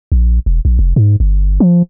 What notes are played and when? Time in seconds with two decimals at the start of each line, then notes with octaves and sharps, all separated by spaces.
0.12 A#1
0.46 E1
0.65 A#1
0.79 F1
0.96 G#2
1.20 G1
1.60 F3